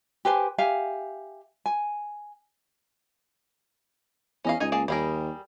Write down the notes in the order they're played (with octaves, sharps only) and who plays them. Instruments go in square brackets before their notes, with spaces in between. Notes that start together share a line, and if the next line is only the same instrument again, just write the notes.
[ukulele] G4 B4 C5 G#5
G4 E5 F5 G#5
G#5
[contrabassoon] E2 [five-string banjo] C#4 D#5 F5
[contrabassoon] C#2 [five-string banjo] D#4 G#5
[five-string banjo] A#3 G#4 A5
[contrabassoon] D#2 [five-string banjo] G3 G#4 A#4